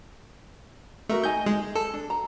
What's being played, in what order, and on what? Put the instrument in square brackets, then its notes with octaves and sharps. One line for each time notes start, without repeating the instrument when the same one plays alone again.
[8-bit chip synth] A3 [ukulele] F#4 A#4 E5
[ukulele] D#4 D#5 G#5 [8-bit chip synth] G6
[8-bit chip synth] G#3 [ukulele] G#4
[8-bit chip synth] A4
[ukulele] D4
A#5